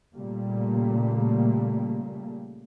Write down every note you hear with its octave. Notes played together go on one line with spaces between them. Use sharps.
A#2 C#3 G3 A3 A#3